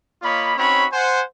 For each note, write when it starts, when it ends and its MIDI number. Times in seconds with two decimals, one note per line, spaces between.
0.22 0.55 58
0.22 0.55 65
0.22 0.55 73
0.22 0.55 75
0.22 0.55 83
0.56 0.85 60
0.56 0.85 61
0.56 0.85 63
0.56 0.85 66
0.56 0.85 73
0.56 0.85 83
0.92 1.22 72
0.92 1.22 78
0.92 1.22 80